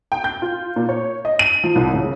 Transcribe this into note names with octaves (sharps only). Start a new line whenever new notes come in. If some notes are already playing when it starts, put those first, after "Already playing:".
G5
G6
F4
A#2
C#5
D#5
D#7
F3
C2
C#3